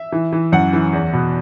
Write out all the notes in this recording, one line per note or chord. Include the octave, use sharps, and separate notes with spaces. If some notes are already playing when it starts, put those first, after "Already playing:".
Already playing: E5
E3
E3
F#2 F#5
E3
E2
B2